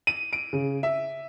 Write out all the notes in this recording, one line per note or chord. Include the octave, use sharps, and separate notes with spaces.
D#7
D7
C#3
E5